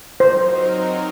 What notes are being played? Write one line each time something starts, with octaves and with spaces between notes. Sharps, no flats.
F#3 C4 D#4 A#4 C5